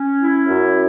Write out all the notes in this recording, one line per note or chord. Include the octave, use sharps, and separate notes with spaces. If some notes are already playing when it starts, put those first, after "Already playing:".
Already playing: C#4
E4
F#2